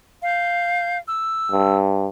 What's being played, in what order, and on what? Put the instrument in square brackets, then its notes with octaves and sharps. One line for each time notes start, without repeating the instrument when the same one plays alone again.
[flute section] F5 G6
E6
[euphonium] G2